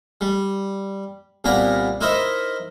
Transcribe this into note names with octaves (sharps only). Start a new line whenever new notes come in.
G3
C2 A#2 A#3 B3 D5 A#5
D#4 E4 A#4 C5 D#5 E5